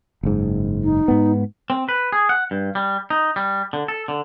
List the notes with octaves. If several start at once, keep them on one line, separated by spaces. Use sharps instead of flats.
F#1 G#2
D#4
G#2 B3
C4
B4
G#4
F#5
G2
G3
D#4
G3
D3
A4
D3